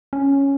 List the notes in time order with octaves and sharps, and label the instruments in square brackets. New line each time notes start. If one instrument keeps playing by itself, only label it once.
[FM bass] C#4